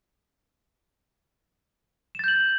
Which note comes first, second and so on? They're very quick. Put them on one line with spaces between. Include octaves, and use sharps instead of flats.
E7 A6 G6 F#7